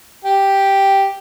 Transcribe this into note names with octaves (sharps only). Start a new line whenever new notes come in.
G4